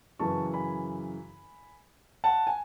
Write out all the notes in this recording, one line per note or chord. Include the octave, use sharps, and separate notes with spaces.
F#2 C#3 E3 A5 C#6
G#5 B5
F#5 A5
G#5